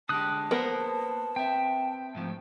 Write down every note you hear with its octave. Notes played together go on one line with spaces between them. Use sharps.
D3 G#3 G4 A5 D#6 F#6
A#3 B3 A#4 C5
C4 E5 G5
G#2 F3 A3